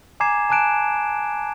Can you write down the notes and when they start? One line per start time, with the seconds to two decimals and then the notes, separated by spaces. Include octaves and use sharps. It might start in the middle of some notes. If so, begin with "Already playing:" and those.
0.20 G#5 A#5 D6 G#6 C7 E7
0.50 G#5 A5 D6 F#6 D7 E7